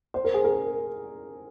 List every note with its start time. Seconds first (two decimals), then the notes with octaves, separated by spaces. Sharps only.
0.14 C5
0.24 A#4
0.34 G#4
0.44 A#4